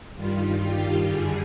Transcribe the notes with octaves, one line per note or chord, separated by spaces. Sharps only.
G2 D#3 G3 F4
G4
F#2 D3 G3 G#4